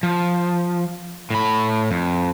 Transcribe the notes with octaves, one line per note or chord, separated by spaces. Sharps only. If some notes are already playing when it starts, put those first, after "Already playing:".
F3
A2 B5
F2